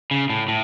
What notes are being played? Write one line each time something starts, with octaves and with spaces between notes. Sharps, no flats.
C#3
A2
A2